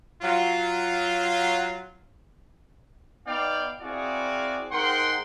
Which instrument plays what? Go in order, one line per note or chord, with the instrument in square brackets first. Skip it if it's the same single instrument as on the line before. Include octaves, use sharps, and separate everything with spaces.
[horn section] F#3 F4
B3 D#4 D5 F5 G5
C4 E4 F#4 G#4 D5 F5
G#2 A#4 F#5 G5 C6